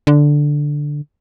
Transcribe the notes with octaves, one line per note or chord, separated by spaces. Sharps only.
D3